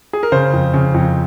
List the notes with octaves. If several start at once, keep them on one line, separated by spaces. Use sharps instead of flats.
G#4
A#4
C#3 C5
F2
C#3
F2